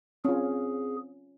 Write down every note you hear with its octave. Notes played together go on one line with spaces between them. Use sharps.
C4 C#4 F4 G#4